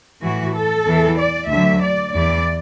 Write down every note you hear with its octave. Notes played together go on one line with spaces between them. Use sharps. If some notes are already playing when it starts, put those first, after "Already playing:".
A2 E3 F#4
A4
E2 E3
D5
D2 D3 F#3 E5
D5
E2 E3 D5